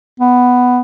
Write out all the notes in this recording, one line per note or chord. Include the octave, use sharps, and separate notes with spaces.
B3